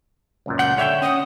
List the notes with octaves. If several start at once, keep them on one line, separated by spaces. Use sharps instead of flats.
C#2 F#2 A#2
F#5 G6
D3 C#5 E5 G5
C#4 F#5 D#6